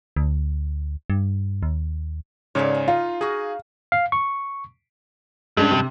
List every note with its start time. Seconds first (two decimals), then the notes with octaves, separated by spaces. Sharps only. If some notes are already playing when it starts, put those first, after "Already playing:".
0.16 D2
1.10 G2
1.63 D#2
2.55 G#2 C#3 A4 B4 C#5 D5
2.75 G#5
2.88 D#4 F4 F5
3.21 D#4 F#4 G#4
3.92 F5
4.12 C#6
5.57 G2 G#3 C#4 D4
5.71 C3